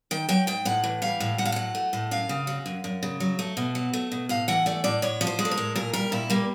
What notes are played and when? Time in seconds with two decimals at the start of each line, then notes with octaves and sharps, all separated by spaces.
0.11 D#3 G5
0.29 F#3 G5
0.47 G#2 G5
0.65 A2 F#5
0.84 E3
1.02 G3 F5
1.20 A2
1.38 A2 F#5
1.45 F5
1.52 F#3 F#5
1.75 A3
1.93 A2
2.11 F#2 F5
2.29 C#3
2.47 F#3
2.66 F#2
2.84 F#2
3.03 C#3
3.20 F#3
3.39 A3
3.57 B2
3.75 F#3
3.93 A3
4.12 B2
4.29 A2 F5
4.48 E3 F#5
4.66 A3 D5
4.84 A2 D5
5.02 A2 C#5
5.21 F3
5.27 C5
5.39 G#3
5.45 A4
5.51 A#4
5.58 A2
5.75 A#2 A#4
5.93 G3 A#4
6.12 A#2 E4
6.30 G3 A#3